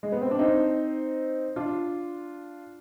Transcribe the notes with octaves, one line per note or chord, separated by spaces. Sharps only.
G#3
B3
C4
D4
C4 D#4
D4 F4